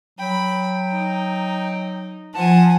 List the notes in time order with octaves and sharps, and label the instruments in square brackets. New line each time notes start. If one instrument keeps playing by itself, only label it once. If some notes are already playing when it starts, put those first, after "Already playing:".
[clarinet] F#3 [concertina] G5 [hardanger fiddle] B5
[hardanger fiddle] D#4
[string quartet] F3 [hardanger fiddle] F#5 G#5 [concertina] A5